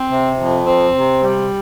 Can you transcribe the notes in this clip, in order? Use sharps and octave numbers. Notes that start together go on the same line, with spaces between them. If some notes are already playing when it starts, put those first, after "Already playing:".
Already playing: C4
C3
F2
C4
C3
G3